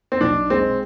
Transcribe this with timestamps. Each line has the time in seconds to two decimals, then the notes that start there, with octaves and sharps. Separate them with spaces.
0.12 C4
0.21 B1 D4
0.50 G#3 C4